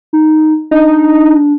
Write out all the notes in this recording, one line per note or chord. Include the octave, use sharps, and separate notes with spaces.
D#4
D4 D#4